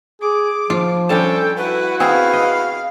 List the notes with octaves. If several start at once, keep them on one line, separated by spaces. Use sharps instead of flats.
G#4 D6
F3 F4
G3 C#4 D4 A4 G5 A5
E4 F#4 B4
B3 C4 G#4 B4 F5
D#5